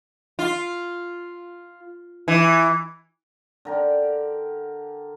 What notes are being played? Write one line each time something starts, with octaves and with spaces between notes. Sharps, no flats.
F4
E3
D3 A#4 G5